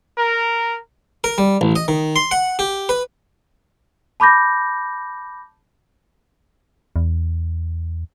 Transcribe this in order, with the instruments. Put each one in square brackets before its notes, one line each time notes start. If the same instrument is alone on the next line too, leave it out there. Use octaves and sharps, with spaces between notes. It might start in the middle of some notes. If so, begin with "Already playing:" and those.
[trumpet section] A#4
[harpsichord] A#4
G3
A1
D#5
D#3
C6
F#5
G4
B4
[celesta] A5 B5 D6 G6 A#6
[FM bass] E2